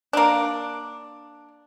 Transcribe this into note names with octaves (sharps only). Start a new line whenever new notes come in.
A#3 D4